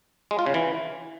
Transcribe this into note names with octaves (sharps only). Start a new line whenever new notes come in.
G#3
F4
C#3
E3